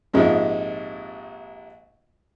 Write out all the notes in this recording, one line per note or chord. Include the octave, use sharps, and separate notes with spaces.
A#1 G#2 C3 F3 G#3